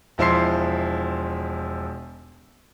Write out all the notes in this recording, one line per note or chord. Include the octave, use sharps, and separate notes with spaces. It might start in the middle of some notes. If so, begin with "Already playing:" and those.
E1 F3 E4 C6 C7